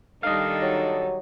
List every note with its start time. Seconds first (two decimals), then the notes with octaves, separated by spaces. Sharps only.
0.23 D#3 G3 D4 D#4 A4 D#5 F5
0.62 F#3